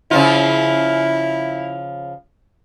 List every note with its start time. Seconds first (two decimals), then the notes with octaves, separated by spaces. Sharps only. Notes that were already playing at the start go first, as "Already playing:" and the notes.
0.11 C#3 F3 E4 F4